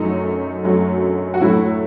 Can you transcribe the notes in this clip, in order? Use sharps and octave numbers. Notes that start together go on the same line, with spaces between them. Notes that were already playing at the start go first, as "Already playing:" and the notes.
Already playing: F#2 F#3 A3 D#4
F#2 F#3 A3
F#4
A2 F#3 A3 E4